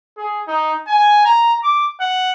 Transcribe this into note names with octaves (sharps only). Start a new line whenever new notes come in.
G#4
D#4
G#5
A#5
D6
F#5